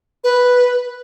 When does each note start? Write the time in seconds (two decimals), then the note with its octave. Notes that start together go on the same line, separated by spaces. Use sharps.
0.24 B4